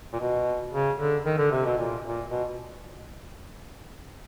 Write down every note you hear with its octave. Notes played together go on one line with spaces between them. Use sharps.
A#2
B2
C#3
D3
D#3
D3
C3
B2
A#2
A#2
B2